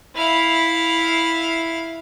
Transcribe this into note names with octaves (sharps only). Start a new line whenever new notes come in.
E4 F5